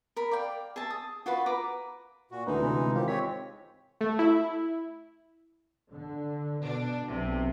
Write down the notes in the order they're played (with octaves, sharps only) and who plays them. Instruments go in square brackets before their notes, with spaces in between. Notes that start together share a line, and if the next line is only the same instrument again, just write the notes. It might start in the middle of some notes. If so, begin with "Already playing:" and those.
[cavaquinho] A#4 B5
D5 F5 G5
G#4 E5 A5
D#6
F4 F#4 B4 B5
B4 A#5 D6
[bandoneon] A#2 F#4
[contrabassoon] D2 [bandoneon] E3 G#3 D#4 [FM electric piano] B4
[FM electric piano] C3 B4
[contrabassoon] G#1
[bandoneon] E3 G4 [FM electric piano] F4 A#4 C5
[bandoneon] G#3 C4 C#5 [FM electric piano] B6
[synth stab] A3
E4
[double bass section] D3
[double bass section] B2 [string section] D4
[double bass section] B1 [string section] C3